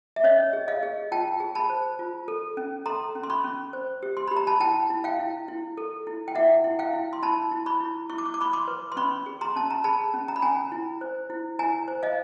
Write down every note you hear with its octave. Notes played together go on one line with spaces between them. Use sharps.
E5
C#4 C#5 D#5
G#4
D#5 F5
G#4
F4 G5 A5
G#4
A5 B5
C5
F4
A4
C#4
A4 A#5 C6
C#4
C6
B5 C#6
C#4
C5
G4
C6
G4 B5
A#5
A5 B5
E4 G5 A5
E4
F5 G5
E4
E4
A4
E4
G5
E4 E5 F#5
E4
F5 G5
E4
C6
E4 A5 B5
E4
B5 C#6
E4
E4 C#6
D6
C#6
D6
E4 B5 C#6
C6 D6
B4
C6
C#4 B5 C#6
G#4
A#5 C6
C#4 A5
A#5
G#4 A5 B5
C#4
A#5
B5
C#4 G#5 A#5
E4
C5
E4
E4 G#5 A#5
C5
D#5 F5